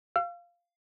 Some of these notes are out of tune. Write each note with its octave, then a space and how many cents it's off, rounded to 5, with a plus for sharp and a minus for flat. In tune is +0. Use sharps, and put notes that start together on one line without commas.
F5 +0 E6 +45